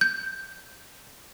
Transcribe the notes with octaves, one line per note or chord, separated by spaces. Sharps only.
G6